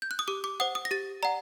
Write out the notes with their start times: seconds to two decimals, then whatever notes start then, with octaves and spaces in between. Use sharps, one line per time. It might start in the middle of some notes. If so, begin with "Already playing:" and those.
0.02 G6
0.11 F#6
0.19 D#6
0.28 G4 D6
0.44 D6
0.60 C5 F#5 D#6
0.75 D#6
0.85 A#6
0.91 G4 A6
1.23 D5 F#5 A#5